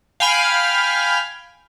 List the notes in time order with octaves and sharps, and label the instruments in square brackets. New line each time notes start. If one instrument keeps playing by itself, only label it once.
[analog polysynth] F5 G5 G#5 B5 F6